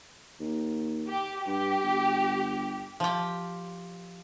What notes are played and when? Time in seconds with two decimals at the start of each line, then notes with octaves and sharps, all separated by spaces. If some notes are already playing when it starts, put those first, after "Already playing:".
0.40 D#2
1.08 G4
1.46 G2 G4
1.83 G1
3.00 F3 G4